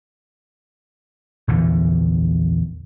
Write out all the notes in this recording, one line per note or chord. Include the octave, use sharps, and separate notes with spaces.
A#1 E2 D3 E3